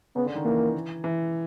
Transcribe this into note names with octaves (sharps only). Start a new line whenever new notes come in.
C#3 B3
D3
D#3
E3 A#3
E3